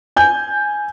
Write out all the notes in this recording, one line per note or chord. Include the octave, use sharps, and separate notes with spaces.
G#5 G6